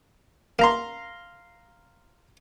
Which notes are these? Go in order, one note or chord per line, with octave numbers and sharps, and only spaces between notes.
A#3 F5 A#5 C6